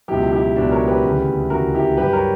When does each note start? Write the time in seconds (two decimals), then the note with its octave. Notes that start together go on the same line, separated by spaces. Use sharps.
0.08 C#2 B2 F#3 E4 G4
0.32 E4 G4
0.56 C#2 B2 F#3 D4 F#4
0.71 A#4 C#5
0.87 G4 B4
1.03 D2 C#3 E3
1.50 D2 C#3 E3 F#4 A#4
1.74 E4 G4
1.97 G2 F#3 G4 B4
2.13 A#4 C#5